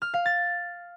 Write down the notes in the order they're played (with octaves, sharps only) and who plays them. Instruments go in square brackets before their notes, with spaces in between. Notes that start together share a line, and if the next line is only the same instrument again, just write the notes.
[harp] F6
F5
A6